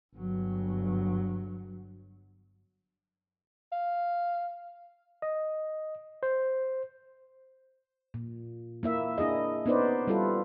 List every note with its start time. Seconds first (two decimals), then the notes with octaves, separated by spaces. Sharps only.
0.16 G1 F#3
3.72 F5
5.22 D#5
6.23 C5
8.14 A#2
8.83 A#3 E4 E5
9.18 D4 E4 G#4 D#5
9.66 B3 C#4 D#4 B4 C5 D5
10.07 G3 E4 F4 A4 B4